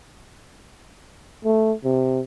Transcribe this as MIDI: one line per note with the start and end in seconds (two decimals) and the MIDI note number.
1.45 1.73 57
1.84 2.21 48